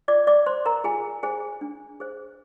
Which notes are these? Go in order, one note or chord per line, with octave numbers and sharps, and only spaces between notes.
F4 D5 D6
D5 D6
C5 C6
A#4 A#5
F4 G#4 G#5
G#4 C5 G#5
D4
G#4 C5